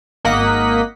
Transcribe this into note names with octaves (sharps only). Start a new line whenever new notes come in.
G#1 A#3 D#5 F#5 B6